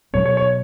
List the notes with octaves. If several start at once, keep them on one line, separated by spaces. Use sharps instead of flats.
B2 F#3 B3 C#5
C#5
C#5